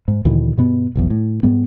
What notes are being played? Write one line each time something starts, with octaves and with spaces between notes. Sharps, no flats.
G#2
D2 A#2 D#3 E3
G2 B2 B3
F1 B1 E2
A2
G#2 G3 B3